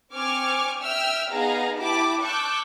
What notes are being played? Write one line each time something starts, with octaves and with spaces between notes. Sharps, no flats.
C4 G#5 C#6 D6 F6
E5 G5 E6 F6
B3 D#4 G#4 D#5 F5 A#5
E4 G4 A5 B5 D6
A5 C#6 D6 E6 F#6 G6